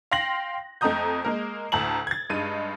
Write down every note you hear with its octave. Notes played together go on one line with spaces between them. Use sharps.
F5 G5 C6 A#6 F#7
F2 A3 D#5 A#5 D#6 G6
G#3 A#3 A#4
D2 A2 A5 A#5 F#7
G#6 A6
G2 G#3 D#4 D#7